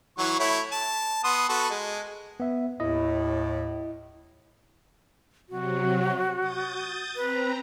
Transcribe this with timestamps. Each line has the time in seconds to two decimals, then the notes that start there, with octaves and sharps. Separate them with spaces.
0.18 E3 F#3 C#6
0.39 A3 E4 C#5
0.72 A5
1.24 B3 C6 D#6
1.49 B3 F#4 A4
1.70 G#3
2.40 B3 E5
2.80 D#2 A2 E4 D#5
5.49 C3 F#3 F#4
6.40 D#6 G6 A6
7.16 C4 B4 A#5